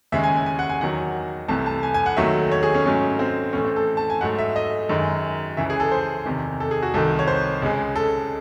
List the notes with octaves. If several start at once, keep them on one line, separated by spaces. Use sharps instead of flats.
D#2 C#3 G#3 E5
G#5
G#5
G#5
F#5
G#5
E2 D#3 F#3 F#5
C2 C3 E3 A3 A5
A5
G#5
G#5
F#5
D#2 D#3 F#3 A3 E5
C#5
G#4
C#4
G#2 F#3 A3 C#4
C4
A2 E3 A3 C#4
C4
A4
A5
G#5
G#2 F#3 A3 F#5
E5
D#5
F#2 D#3 G#3
C#2 C#3 E3 E5
G#4
A4
C5
E2 C3 D#3
A4
G#4
F#4
C2 C3 D#3 A4
C#5
C5
C#2 C#3 G#3
A4